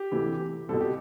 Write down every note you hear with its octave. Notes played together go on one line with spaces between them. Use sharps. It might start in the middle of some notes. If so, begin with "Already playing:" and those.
Already playing: G4
D2 C3 E3
C2 B2 A4
G4